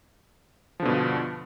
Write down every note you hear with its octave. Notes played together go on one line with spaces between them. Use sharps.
G2 B2 D3 F3